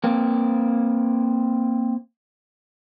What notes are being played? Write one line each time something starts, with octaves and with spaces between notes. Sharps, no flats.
A#3 C4